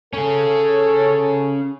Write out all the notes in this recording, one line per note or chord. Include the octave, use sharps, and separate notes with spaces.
C#4 G#4 A4 C#5